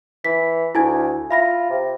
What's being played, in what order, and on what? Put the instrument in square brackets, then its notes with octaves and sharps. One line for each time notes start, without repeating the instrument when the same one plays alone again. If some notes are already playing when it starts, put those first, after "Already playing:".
[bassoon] E3 [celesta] B6
[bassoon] D2 [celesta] E4 G#5 G#6
[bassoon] F4 [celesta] E5 B5 A#6
[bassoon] C3